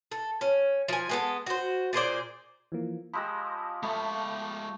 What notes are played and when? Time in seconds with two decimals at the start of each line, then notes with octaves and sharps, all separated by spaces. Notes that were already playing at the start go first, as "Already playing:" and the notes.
0.11 A4
0.41 C#4
0.88 F3 G#5
1.09 G#3 B3 A4
1.46 F#4 C5
1.93 A#2 G#4 C5 D5
2.72 E3 F3 A#3
3.13 F3 G#3 G4 B5 E6 A#6
3.83 G#3 A3 E5 B5 C#6